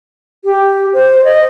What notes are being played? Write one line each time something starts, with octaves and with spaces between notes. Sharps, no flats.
G4
C5
D#5